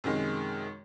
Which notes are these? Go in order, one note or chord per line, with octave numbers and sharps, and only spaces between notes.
F#2 C3 D#3 G#3